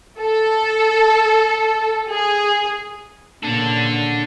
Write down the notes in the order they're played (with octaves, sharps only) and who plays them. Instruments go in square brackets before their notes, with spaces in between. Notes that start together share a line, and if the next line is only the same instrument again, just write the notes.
[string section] A4
G#4
[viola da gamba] A#2 C#3 [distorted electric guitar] D4 A4